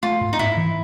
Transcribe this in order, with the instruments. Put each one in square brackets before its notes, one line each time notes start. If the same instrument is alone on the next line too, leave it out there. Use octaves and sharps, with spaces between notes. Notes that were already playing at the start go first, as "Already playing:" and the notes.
[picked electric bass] A3 [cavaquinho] F4
[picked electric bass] G#2
[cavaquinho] D#4
[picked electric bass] G#2 [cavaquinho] E4
[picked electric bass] E3